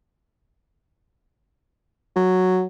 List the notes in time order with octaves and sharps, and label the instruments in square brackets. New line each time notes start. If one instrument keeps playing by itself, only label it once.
[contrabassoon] F#3